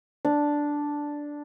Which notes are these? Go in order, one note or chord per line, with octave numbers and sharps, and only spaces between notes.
D4